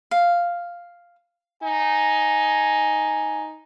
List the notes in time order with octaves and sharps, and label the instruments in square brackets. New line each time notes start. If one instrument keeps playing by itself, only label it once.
[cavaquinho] F5
[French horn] D#4 [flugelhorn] G#5